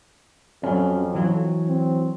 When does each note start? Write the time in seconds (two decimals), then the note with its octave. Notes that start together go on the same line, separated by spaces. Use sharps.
0.63 F2 F#3 C#4
1.15 E3 F#3
1.68 C4